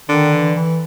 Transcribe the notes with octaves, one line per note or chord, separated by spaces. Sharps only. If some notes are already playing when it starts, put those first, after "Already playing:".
D3 D#3
E3
E3